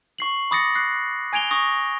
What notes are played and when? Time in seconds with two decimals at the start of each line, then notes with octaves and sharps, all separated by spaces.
0.19 C#6 C7 F#7
0.51 B5 D6 D#6 A6 A#6 C#7
0.75 F#6 C7
1.33 G#5 G#6 D7 F7 G7
1.51 C#6 D#6 A#6